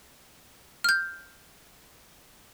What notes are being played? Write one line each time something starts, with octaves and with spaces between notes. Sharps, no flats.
F6 G6